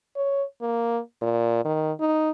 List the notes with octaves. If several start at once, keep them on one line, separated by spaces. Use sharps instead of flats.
C#5
A#3
A#2
D#3
D#4